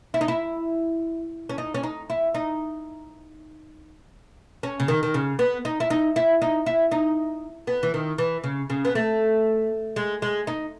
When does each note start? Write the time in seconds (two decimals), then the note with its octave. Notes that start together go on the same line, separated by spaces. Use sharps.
0.14 E4
0.21 D#4
0.28 E4
1.49 C#4
1.58 D#4
1.74 C#4
1.83 D#4
2.10 E4
2.34 D#4
4.63 C#4
4.80 C#3
4.88 D#3
5.03 D#3
5.14 C#3
5.39 B3
5.65 D#4
5.80 E4
5.90 D#4
6.16 E4
6.42 D#4
6.66 E4
6.91 D#4
7.67 B3
7.83 E3
7.94 D#3
8.18 E3
8.44 C#3
8.70 C#3
8.85 B3
8.95 A3
9.96 G#3
10.22 G#3
10.47 D#4